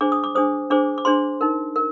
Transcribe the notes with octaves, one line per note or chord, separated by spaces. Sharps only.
D4 G#4 C5 D6
D#6
D6
D4 G#4 C5 D#6
D4 G#4 C5 D6
D6
D4 G#4 C5 C6
D#4 A#4
A#4